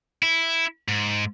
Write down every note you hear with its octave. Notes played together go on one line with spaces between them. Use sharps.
E4
G#2